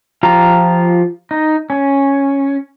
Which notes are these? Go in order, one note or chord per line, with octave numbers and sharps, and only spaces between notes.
F3 F4 G4 A#5
D#4
C#4